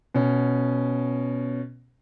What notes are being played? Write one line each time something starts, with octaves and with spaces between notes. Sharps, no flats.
B2 C#4